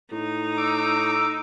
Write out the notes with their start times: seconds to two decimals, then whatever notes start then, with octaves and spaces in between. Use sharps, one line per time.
0.12 A2 D#4
0.57 D6 E6